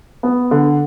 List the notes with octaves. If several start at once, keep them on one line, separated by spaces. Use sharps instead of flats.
B3
D3